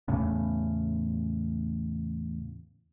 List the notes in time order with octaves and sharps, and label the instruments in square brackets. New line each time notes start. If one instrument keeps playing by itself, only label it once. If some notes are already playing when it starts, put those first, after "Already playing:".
[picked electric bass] E2 A2 C#3